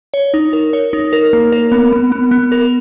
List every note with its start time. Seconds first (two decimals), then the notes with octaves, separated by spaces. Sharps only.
0.14 C#5
0.34 D#4
0.53 A#4
0.73 C#5
0.93 D#4
1.13 A#4
1.33 A#3
1.52 A#4
1.72 B3
1.92 B3
2.12 B3
2.31 B3
2.52 A#4